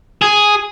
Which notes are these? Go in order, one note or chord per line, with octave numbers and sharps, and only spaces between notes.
G#4